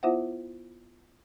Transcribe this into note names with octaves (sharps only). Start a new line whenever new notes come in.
B3 E4 F4 C5 E5 F#5